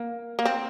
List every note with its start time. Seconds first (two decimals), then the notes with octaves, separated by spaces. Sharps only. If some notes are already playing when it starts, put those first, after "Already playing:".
Already playing: A#3
0.39 A#3
0.45 C4